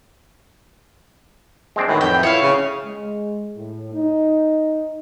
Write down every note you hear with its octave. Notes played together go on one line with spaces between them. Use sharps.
G#3 C4 D4
A2 D#3 E3 F#3
F2 G5
E4 C#5 F5
C#3
G#3
A2
D#4